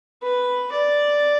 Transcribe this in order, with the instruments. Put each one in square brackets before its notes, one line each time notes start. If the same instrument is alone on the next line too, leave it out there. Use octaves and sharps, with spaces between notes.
[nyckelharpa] B4
D5